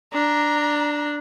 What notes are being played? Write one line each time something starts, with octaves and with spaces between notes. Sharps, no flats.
D4 A#5